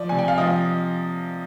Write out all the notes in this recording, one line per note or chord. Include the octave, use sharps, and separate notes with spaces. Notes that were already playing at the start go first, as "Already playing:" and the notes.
Already playing: F3 D5
C3 G#5
G5
F5
F3 D#5